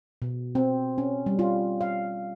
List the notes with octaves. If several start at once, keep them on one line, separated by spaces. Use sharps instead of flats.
B2
C4
C#4
G3
F4
F5